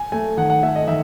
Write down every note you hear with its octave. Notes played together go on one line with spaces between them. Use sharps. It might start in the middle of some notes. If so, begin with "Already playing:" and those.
Already playing: G#5
A3 G#5
D#3 F#5
F#5
A3 E5
D#5
D#3 E5